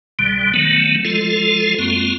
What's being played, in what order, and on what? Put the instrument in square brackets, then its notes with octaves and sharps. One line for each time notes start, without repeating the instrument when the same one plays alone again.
[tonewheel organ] C2 B2 D3 G3
D#3 F#3 A3 B3
F3 G#3 F4 A4
F#2 G#3 A#3 C4 F4